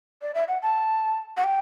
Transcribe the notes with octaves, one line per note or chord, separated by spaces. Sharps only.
D5
E5
F#5
A5
F#5
G5